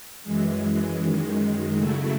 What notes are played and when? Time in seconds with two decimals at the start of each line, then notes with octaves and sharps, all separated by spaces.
0.24 F#2 E3 G#3
1.01 F#2 D#3 G#3
1.76 C#3 F#3 A3 E4